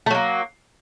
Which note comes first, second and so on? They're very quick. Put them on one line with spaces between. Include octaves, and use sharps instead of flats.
A3 F#3 A#3